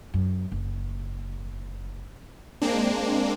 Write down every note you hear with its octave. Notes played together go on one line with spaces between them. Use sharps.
F#2
F#1
G#3 A#3 C4 D4